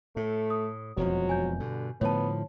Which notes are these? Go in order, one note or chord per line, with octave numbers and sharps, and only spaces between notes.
A2 A3
D#6
E1 F2 F3 F#3
G#5 G6
G2 B2 D3
A2 D3 F3 B3 C#5 A5